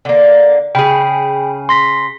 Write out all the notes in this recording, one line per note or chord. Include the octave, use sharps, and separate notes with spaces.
D3 A#3
C#3 G#4 G5 B5
C6 A#6 B6